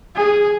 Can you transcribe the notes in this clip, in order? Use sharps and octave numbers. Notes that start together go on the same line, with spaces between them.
G#4